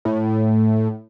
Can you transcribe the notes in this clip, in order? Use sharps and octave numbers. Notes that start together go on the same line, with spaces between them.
A2